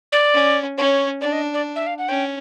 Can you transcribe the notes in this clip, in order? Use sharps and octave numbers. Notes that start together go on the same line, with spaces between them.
D5
C#4
C#4 C#5
D4 D5
D#5
D5
E5
F5
F#5
C#4 G5